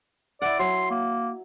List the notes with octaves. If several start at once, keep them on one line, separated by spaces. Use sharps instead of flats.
E4 D5 F#5
F#3 C6
A#3